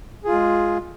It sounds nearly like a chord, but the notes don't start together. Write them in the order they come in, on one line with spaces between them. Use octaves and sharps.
G#4 F4 G#3